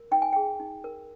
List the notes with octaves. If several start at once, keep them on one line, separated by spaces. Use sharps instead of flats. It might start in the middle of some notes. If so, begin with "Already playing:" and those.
Already playing: A#4
D#4 G5
G#5
G#4 G5
D#4
A#4